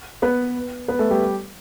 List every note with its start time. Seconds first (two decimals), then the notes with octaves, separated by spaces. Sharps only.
0.22 B3 B4
0.88 B3 B4
0.99 A3 A4
1.10 G3 G4